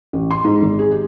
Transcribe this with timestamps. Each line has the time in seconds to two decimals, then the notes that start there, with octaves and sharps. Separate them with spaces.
0.13 A1
0.31 C6
0.44 G#2
0.62 G#1
0.79 G#4
0.92 G4